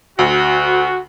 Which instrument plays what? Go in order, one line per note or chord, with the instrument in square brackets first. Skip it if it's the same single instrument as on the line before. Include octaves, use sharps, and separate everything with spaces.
[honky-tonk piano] D2 [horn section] F#4